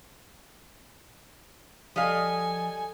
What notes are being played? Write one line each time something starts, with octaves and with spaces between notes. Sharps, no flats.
F3 G3 A4 D#5 F5 G#5